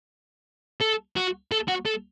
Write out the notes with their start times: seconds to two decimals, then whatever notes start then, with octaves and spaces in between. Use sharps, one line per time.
0.81 A4
1.17 F#4
1.52 A4
1.68 F#4
1.86 A4